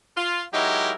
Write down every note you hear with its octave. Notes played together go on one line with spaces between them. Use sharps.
F4
F#3 G#3 D#4 E4 G4 A#4